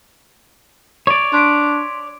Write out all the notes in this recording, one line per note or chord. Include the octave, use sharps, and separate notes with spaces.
C#5 D5
D4 C6 B6 D7